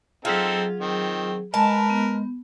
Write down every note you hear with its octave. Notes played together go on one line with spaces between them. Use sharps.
F#3 C4 D#4 F4 G#4 A4
D#3 C4
G#3 A#4 B4 D#5 G#5 A5
B3